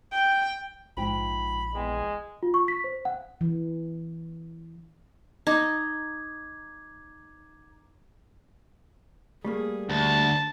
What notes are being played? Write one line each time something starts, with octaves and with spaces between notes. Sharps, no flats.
G5
A#1 G#2 F4 G5 B5
E2 G#3 G5
F4
C#6
B6
C5
F#5
E3
D#4 A#5 D6 G#6
G3 A3 A#3 G#4
D2 A5